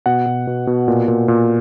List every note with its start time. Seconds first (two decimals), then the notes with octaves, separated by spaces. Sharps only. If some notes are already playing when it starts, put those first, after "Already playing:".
0.06 B2 F#5
0.26 B2
0.47 B2
0.67 B2
0.88 A#2
1.08 A#2
1.28 A#2